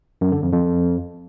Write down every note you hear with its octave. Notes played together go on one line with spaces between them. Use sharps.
F#2
D3
F2
F2